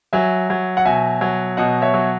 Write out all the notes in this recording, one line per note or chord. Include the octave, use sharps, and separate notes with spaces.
F#3 E5 G#5
F#3
F#5
B2 E5 G#5
F#3
B2 D#5 F#5
C#5 E5
F#3